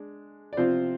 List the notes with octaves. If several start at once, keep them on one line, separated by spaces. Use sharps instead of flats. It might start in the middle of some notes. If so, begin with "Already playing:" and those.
Already playing: G#3 D4
D5
C3 F3 C4 F4 C5